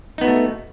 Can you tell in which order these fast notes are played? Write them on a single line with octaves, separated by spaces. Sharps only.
D#4 B3 F#4 A3